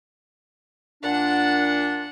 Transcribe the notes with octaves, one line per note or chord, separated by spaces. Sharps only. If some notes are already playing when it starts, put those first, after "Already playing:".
A#2 D4 F#5